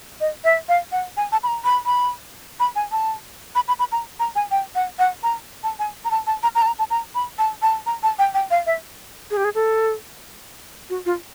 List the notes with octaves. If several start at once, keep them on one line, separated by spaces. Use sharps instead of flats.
D#5
E5
F5
F#5
G#5
A5
B5
A#5
B5
B5
B5
G#5
A5
B5
B5
B5
A#5
A#5
G#5
G5
F#5
F#5
A#5
A5
G#5
A#5
A5
A5
A#5
A#5
A5
A#5
A5
A#5
B5
A5
A5
A#5
A5
G5
G5
F5
E5
G#4
G4
G#4
A4
F#4
F4